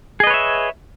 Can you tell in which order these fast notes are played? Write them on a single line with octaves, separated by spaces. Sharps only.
G#4 D#5 B4 C#5 E5